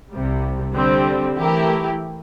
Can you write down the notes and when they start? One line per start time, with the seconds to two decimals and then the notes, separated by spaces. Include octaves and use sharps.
0.12 C2 C3 G3
0.74 D3 G3 C4
1.36 E3 A3 E4 G4 A#4